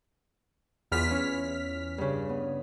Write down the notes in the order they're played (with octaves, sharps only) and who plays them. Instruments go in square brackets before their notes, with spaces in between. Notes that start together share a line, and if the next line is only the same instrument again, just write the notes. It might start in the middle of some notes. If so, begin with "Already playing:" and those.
[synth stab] E2 F6 B6 [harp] E4 F4 B4
[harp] C#4 E4
G2 C#3
B3